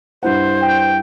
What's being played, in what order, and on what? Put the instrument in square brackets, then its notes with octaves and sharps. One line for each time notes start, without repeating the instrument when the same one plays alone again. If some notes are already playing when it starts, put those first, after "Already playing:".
[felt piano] G2 E4 F#5 [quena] C5
[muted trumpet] G5